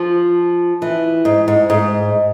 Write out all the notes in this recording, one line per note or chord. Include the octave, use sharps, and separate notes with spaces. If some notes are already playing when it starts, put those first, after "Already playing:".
Already playing: F3
E3
G#2
G#2
G#2